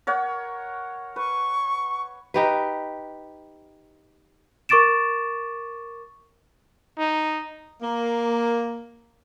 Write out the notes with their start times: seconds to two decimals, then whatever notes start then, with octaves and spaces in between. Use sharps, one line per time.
0.07 A#4 C#5 F#5
1.16 B4 C#6
2.34 D#4 G4 B4
4.69 A#4 C#6 D6 A6 D7 E7
6.99 D#4
7.82 A#3